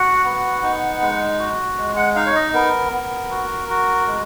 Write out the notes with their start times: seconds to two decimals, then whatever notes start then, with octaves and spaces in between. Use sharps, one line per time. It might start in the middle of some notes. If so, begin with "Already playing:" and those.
Already playing: F#4 F#5
0.24 B3
0.62 D#4
1.01 G#3
1.39 F#4
1.77 G#3
1.96 F#5
2.16 D#4 F5
2.26 C#5
2.36 D#5
2.53 B3 A#4
2.92 B3
3.31 F#4
3.69 F#4
4.07 G#3